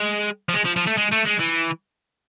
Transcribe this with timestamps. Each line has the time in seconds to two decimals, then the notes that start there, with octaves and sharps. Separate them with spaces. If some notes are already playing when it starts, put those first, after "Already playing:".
Already playing: G#3
0.49 F3
0.54 G#3
0.65 F3
0.76 F3
0.87 A3
0.97 G#3
1.11 A3
1.25 G#3
1.39 E3